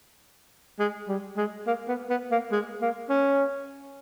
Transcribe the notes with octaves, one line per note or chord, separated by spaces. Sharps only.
G#3
G3
G#3
A#3
B3
B3
A#3
G#3
A#3
C#4